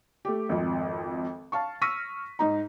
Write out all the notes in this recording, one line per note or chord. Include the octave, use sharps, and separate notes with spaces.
A3 G4
G#1 F2
F5 A5 C#6
C#6 E6 F6 A#6 B6 D#7
G#2 D#4 A#5